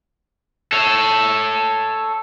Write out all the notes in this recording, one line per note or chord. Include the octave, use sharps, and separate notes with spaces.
A4 C#5